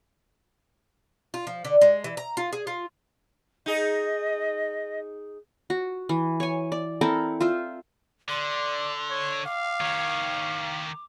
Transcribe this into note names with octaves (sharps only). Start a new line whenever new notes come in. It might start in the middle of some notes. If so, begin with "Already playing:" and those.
F4
F3
D3
G#3
E3
A#5
F4
G#4
F4
D#4 G#4 D#5
F#4
E3
C#5 G#5
D5
C4 E4 A4 A#4
F4 C5 E5
D3 D5 C6
C#5
F5 D6
D#3 C#5